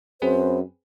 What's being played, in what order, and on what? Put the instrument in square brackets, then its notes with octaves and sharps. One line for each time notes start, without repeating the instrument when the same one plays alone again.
[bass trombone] F#2 [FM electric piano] C4 G#4 B4 [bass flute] C5